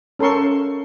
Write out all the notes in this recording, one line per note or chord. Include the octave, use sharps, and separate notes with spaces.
C#4 A4 A#4 C6 C#6